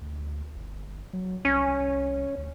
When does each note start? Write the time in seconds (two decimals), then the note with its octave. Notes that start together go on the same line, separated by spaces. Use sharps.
0.01 D2
0.55 G1
1.13 F#3
1.45 C2 C#4
2.38 D2